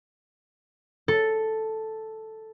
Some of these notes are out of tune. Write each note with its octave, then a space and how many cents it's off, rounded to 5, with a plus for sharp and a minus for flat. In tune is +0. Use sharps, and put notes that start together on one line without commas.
A4 +0